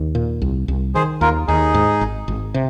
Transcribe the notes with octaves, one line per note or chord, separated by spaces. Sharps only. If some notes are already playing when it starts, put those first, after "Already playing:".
Already playing: D#2
A#2
C2
C2
D#3 G#4 C5
D#2 F4 A#4
D#2 D#4 G#4
G#2
G#1
G#1
C3